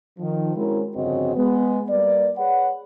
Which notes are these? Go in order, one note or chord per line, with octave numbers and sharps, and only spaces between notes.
D#3 F3
G#3 C4 C#4 E4 F#4 A#4
G1 F2 C#3 C4 F#4 D#5
G#3 B3
G3 A#3 B4 D5
G#4 B4 C#5 F#5